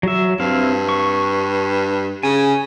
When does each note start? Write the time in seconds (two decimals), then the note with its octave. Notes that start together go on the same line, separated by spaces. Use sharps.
0.03 F#3 E5
0.40 G2 C4 E4 F5
0.89 C#6
2.23 C#3 G#5